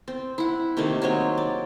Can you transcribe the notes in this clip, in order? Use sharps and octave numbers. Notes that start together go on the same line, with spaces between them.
C4
E4 F#5
C3 D#3 A3 A#3
F#3 G#3 C4 C#5
D5